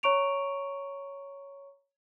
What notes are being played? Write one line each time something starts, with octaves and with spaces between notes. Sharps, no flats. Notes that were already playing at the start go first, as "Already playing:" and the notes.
C#5 A#5 C#6 D7 F7